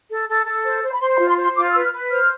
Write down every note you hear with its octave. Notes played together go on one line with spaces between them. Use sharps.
A4
A4
A4
C5
C5
B5
C5 C6
B5
F4
C6
C5
C6
F4 D6
E6
B4
F6
B4
C5 F6